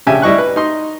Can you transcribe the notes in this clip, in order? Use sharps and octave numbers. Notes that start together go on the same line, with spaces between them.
A#1 C#3 G4 E5 G#5
G3 E4 D#5 C#6 F#6
B4
D#4 C6